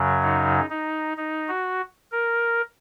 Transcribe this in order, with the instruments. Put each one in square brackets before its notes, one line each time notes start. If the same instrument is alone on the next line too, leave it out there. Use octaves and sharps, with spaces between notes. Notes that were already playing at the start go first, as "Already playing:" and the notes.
Already playing: [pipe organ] F#2 C#3 F#3
D#4
D#4
D#4
F#4
A#4